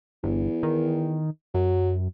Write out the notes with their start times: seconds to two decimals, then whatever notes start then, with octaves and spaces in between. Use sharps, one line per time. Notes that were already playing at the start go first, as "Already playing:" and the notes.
0.24 G1 E2
0.63 D#3
1.54 F#2 F#3